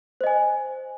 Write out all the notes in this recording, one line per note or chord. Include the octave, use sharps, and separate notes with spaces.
C5 D#5 G#5